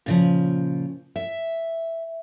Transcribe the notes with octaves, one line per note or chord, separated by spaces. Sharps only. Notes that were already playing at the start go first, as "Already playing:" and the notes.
A#2 C#3 F3
E5